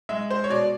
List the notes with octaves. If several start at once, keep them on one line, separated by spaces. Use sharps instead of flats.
G#3 E5
C5
C#5
B2 D5